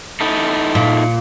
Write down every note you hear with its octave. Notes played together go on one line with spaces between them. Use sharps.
D#4 E4 A4
A#2